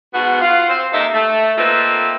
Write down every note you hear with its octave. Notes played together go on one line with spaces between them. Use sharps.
G#2 B2 B3 F#4
F4 F#5
C4 C5
C3 A#3 D#4 A4 E5
A3
A3 A#3 C4 D#4 F4 B4